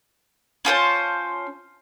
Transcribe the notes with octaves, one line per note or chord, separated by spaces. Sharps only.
C#4 F4 C5 A5